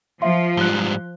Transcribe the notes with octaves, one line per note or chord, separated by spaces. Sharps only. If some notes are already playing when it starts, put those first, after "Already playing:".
F3 E5 F5 C6
G#2 G3 F#6 G7